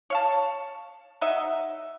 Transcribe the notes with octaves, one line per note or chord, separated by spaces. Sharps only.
C#5 F5 A5
F#3 D#4 D#5 E5